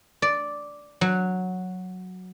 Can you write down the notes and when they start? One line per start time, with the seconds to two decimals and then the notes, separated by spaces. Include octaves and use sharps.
0.22 D5
1.01 F#3